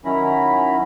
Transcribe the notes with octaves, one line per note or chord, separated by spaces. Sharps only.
D#3 F#3 C#4 E4 A#5 B5